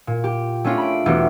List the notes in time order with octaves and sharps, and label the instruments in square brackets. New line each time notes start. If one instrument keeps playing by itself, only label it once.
[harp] A#2
G4
A3 C#4 D4 F4
B5 D7
E1 B2 E3 A3 G4